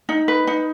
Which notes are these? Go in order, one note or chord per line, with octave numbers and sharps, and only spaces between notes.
D#4
B4
D#4